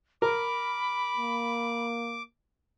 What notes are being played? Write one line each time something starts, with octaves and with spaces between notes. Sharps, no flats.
A#4 B5 D6
A#3